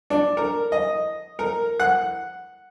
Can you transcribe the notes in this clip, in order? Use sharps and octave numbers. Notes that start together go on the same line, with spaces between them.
D4
A#4
D#5
A#4
F#5